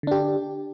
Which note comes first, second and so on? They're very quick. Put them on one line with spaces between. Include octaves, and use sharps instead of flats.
D3 D4 G4